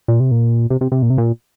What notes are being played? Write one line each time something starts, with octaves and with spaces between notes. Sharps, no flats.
A#2
C3
A#2
C3
C3
C3
A#2
C3
A#2